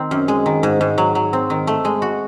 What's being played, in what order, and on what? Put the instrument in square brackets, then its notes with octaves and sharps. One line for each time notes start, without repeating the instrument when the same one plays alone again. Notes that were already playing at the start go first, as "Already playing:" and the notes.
Already playing: [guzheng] D#3 C4
F#2
G#3
D#3
G#2
G#2
F#3
F#3
C4
D#3
A3
G#3
F#4